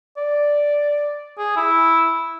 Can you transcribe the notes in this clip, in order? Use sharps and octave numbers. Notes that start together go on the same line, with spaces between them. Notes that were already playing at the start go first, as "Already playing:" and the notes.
D5
G#4
E4